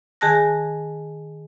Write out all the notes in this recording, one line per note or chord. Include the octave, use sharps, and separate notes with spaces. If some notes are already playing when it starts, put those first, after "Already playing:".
D#3 G#4 G#5 A5 F#6 A#6